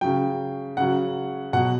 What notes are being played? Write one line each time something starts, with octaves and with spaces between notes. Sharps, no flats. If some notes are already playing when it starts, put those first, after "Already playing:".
C#3 F#3 G5
C#3 F#3 F#5
B2 F#3 F#5